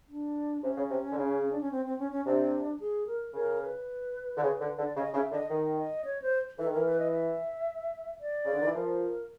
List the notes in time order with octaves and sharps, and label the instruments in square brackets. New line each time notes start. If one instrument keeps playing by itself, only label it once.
[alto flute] D4
[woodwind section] C3 [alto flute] C#4
[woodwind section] C#3
C3
D3
C#3
[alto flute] D4
C#4
C4
C4
C#4
C#4
[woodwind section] C3 [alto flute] D4
[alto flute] G#4
A#4
[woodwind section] C#3 [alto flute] A#4
[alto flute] B4
[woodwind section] D3
C#3
D3
D3
[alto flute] D5
[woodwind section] C#3 [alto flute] D#5
[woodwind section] C#3 [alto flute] E5
[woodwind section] D3 [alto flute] D#5
[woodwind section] D#3 [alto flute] D#5
[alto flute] D#5
C#5
C5
[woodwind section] E3 [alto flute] A4
[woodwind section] D#3
[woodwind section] E3 [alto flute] A#4
[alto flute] B4
D#5
E5
D5
[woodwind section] C#3
D3
D#3
E3
[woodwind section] F3 [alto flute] A#4